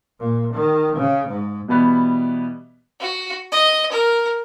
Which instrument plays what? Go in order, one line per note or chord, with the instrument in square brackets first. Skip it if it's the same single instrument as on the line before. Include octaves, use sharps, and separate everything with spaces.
[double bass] A#2
D#3
C#3
G#2
[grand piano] B2 E3 G3 B3 B4
[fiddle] F#4
D#5
A#4